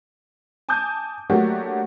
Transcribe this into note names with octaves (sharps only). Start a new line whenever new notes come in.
G#5 A5 D6 D#6 G6
F#3 A3 A#3 D4 F#4 G4